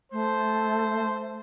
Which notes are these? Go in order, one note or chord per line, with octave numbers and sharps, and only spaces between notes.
A3 C5